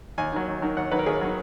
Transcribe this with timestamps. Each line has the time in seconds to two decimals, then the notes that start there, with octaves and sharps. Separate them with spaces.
0.18 D#2 G#5
0.32 D#3 F#3
0.48 D#2
0.62 D#3 F#3
0.77 D#2 F#5
0.91 D#3 F#3 B4
0.99 A#4
1.06 D#2 G#4
1.21 D#3 F#3